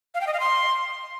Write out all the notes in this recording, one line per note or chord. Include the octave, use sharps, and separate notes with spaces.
F5
G5
D#5
F5
C6